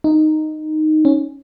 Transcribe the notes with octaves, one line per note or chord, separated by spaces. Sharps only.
D#4
C#4